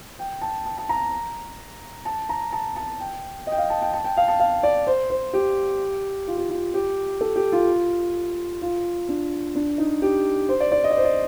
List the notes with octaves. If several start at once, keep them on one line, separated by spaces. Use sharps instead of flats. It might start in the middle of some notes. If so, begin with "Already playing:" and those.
G5
A5
A5
A5
A#5
A5
A#5
A5
A5
G5
D#5 G5
F5
A5
G5
A5
G5
F5
A5
F5
D5
C5
C5
G4
F4
G4
F4
G4
A4
G4
F4
F4
D4
D4
D#4
G4
C5
D5
D5
D#5
D5
C5
D5